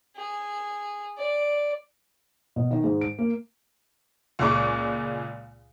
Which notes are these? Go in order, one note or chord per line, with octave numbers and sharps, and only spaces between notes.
G#4
D5
B2
D#3
G#2
D7
A#3
C#2 A#2 G#3 C#6 D6 F#6